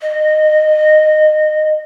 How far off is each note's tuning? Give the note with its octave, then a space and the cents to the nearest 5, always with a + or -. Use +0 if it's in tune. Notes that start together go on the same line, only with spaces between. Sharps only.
D#5 -20